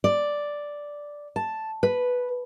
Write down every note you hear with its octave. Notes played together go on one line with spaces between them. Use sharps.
D5
A5
B4